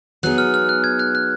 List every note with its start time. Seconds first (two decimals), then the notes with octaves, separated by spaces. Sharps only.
0.23 F#3 B3 D#4 G#4 F#6
0.38 F6
0.54 F6
0.69 F#6
0.84 G#6
0.99 F#6
1.15 F#6